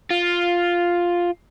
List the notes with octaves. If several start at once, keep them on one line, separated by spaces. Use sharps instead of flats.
F4